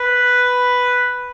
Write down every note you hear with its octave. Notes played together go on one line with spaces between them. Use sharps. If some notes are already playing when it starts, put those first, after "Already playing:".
Already playing: B4